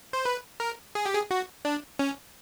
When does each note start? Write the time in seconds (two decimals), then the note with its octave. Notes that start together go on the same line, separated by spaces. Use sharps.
0.13 C5
0.25 B4
0.60 A#4
0.95 G#4
1.06 G4
1.15 G#4
1.31 F#4
1.65 D4
1.99 C#4